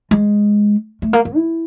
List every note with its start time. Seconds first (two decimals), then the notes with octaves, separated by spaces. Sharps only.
0.11 G#3
1.02 A3
1.13 A#3
1.25 A#3
1.36 E4